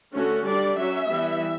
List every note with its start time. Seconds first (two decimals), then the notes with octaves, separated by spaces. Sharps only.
0.14 D3 A3 C#4 F#4
0.46 G3 D4 D5
0.77 F#3 C#4 E5
1.09 E3 G3 B3